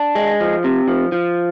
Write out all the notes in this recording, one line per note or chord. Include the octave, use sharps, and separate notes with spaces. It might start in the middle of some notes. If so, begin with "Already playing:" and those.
Already playing: D4
G#3
F3
C3
F3
F3